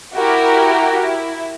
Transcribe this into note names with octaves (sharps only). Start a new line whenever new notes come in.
E4 F#4 G4 A#4
E4